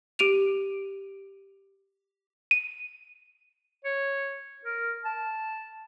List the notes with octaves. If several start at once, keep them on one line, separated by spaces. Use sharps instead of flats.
G4 D7 D#7 F7
D#7
C#5
A#4
A5